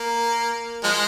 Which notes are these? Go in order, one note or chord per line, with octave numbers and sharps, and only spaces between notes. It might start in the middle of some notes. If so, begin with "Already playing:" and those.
Already playing: A#3
F3 G#3